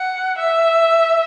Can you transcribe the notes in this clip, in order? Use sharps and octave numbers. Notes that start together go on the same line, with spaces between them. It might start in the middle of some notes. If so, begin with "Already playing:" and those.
Already playing: F#5
E5